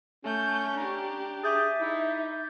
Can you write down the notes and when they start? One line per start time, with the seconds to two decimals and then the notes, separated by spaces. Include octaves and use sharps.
0.25 A3 C#4 G6
0.77 D4 G4 A#5
1.43 G#4 E5 D6 G6 A6
1.81 D#4 E4